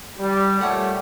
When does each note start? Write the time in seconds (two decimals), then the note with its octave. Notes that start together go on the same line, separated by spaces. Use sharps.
0.18 G3
0.61 A#2 G3 A3 C#5 F#5